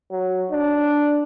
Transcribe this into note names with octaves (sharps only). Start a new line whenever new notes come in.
F#3
D4